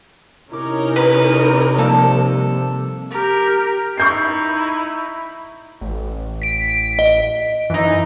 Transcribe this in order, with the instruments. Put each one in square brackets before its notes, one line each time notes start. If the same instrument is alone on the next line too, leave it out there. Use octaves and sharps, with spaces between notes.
[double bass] C3 [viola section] C#4 D#4 A#4 [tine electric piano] E4 D6
[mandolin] B4
[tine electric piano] F3 G3 A#3 [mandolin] A4
[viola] G4 A#4
[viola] D#4 E4 [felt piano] C#6 G6 C7
[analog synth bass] A1
[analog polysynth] B6 D7
[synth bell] D#5
[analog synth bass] F#2 [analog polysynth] E3 D#4